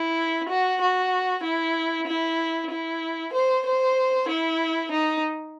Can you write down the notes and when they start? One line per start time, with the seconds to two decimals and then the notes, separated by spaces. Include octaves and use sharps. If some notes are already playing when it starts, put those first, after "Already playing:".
Already playing: E4
0.49 F#4
0.81 F#4
1.43 E4
2.07 E4
2.71 E4
3.33 C5
3.66 C5
4.29 E4
4.92 D#4